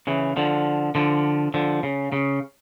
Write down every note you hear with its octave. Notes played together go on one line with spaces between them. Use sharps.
C#3 E3
D3 F3
D3 F3
D3 F3
C#3
C#3